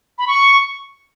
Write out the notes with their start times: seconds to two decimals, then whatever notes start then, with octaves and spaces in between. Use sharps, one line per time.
0.18 B5
0.28 C#6